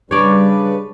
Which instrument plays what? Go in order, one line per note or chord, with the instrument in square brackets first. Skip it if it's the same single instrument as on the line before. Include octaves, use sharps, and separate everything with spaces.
[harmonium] C#3 B4 [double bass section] G3 [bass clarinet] D4 [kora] C#5 D5